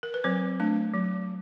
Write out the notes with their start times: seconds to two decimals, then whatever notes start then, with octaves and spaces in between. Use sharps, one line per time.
0.03 A#4
0.14 B4
0.24 F#3 C4 C5
0.60 A3 D4
0.94 F#3